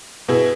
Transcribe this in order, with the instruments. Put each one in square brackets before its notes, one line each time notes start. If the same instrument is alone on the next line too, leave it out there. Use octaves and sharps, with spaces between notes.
[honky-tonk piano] B2 B3 E4 G#4